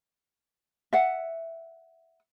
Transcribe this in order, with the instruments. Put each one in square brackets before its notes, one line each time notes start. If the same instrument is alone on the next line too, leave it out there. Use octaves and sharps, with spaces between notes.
[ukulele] E5 F#5